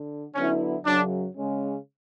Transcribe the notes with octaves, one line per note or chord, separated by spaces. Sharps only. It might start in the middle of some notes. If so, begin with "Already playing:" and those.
Already playing: D3
D3 F#3 B3 C#4 E4
F#2 C#3 F#3 D4
C#3 G#3 C#4